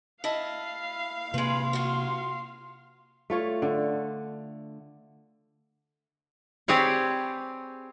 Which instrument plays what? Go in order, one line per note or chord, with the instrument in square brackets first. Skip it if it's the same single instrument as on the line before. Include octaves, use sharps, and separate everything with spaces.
[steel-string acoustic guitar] E4 D#5 A5 [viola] F5
[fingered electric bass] C3 A#3 [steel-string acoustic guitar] G#3 B4 [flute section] C6
[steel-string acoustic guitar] F4 F#4
[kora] A3 F4 C#5
D3
[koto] C4 G4 G#4 B4 C#5 D5